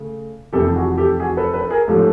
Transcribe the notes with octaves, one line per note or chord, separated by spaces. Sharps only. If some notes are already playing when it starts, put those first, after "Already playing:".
Already playing: C#3 A3
F1 F2 C3 E3 G4 A4
F#4 G#4
G4 A4
F#4 G#4
A4 B4
A4 B4
G#4 A#4
G#2 F3 A3 C#4 G4 A4